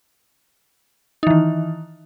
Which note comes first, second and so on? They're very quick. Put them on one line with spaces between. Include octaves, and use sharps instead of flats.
D#4 E3 D#3